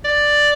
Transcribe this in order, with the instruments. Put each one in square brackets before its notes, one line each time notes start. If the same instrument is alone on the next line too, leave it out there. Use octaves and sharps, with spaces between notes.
[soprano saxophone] D5